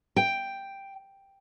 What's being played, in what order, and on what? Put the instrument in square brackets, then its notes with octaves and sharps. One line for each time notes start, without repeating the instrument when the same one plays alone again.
[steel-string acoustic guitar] G5